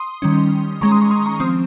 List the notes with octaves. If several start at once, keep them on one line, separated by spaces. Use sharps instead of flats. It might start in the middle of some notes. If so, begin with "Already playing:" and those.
Already playing: C6 D#6
D#3 G3 C#4
D#3 G#3 C#4 A#5 C#6
C6 D#6
A#5 C#6
C6 D#6
A#5 C#6
F3 C4 C6 D#6